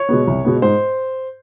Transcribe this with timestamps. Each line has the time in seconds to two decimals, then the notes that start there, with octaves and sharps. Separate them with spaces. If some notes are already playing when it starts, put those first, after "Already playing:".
Already playing: C#5
0.09 B2 G#3 B3
0.27 C2
0.45 B2 G#3 B3
0.62 G#2 C5